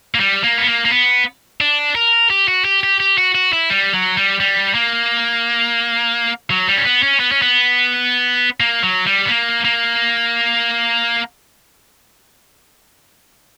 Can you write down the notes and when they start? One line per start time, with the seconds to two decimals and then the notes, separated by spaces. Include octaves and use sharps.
0.15 A#3
0.20 G3
0.44 A#3
0.58 B3
0.66 A#3
0.85 A#3
0.91 B3
1.61 D4
1.95 A#4
2.30 G4
2.48 F#4
2.65 G4
2.83 G4
3.00 G4
3.18 F#4
3.35 F#4
3.53 E4
3.70 G3
3.94 F#3
4.17 G3
4.40 G3
4.75 A#3
6.50 F#3
6.68 G3
6.78 C#4
6.85 B3
7.03 C#4
7.20 B3
7.32 C#4
7.42 B3
8.60 A#3
8.83 F#3
9.06 G3
9.26 B3
9.30 A#3
9.65 A#3